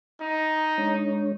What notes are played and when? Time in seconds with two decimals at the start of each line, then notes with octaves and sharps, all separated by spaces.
0.21 D#4
0.78 G#3 D4 C#5